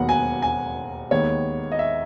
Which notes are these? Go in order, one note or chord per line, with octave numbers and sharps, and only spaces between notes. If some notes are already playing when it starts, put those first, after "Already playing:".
Already playing: E1 D#2 D#3 F#3 B3 F#5
G#5
G#5
D#2 D#3 G#3 B3 C#5
D#5
E5